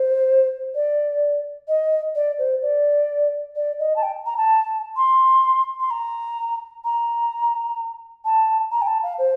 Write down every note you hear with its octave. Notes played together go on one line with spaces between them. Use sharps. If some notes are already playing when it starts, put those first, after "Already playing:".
Already playing: C5
D5
D#5
D5
C5
D5
D5
D#5
A5
G5
A#5
A5
C6
C6
A#5
A#5
A5
A#5
G5
A5
F5
C5